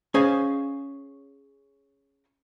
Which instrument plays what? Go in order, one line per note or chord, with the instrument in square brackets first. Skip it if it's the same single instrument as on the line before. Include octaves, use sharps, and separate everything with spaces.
[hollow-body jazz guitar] C#4 G#4 C5 D#5 F5 G#5